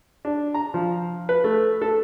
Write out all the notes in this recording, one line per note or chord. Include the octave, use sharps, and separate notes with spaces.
D4
A#5
F3
B4
A3
A4